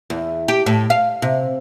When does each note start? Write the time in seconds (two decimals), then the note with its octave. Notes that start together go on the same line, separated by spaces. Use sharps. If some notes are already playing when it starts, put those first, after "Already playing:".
0.10 E2
0.48 G4
0.66 A2
0.90 F5
1.22 C3